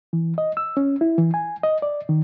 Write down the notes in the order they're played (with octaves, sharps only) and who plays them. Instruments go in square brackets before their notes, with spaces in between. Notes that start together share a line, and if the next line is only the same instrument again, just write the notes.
[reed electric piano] E3
D#5
E6
C#4
E4
E3
G#5
D#5
D5
D#3